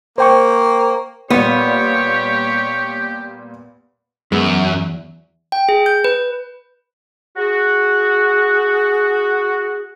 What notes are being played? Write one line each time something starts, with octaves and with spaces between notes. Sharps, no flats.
A#3 C5 G5 C#6
A#2 G3 B3 G4 C#5
F#2 G#3 B3
E2
G5
G#4
G6
B4
F#4 G#4